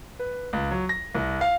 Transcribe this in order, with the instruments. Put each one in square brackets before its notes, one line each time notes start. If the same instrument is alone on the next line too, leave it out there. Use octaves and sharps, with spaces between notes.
[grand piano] B4
C#2
F#3
A#6
C2
F5